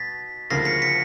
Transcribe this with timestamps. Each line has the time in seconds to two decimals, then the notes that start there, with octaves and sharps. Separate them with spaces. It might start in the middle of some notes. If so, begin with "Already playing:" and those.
Already playing: B2 A6 B6
0.50 D2 C#3 F3 A#3 C#4 A#6 C7
0.65 B6 C#7
0.82 B6 C#7